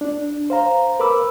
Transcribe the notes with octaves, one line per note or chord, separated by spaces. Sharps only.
D4
C5 F5 A#5
A#4 B4 B5 D6 E6